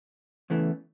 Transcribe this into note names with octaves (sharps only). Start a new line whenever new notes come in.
E2 C#3 E3 A3